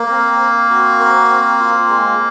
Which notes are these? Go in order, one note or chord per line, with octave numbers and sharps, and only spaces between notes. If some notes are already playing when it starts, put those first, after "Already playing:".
Already playing: A#3 A#4
C4
C4
F#4
A#4
C4
F4
G#3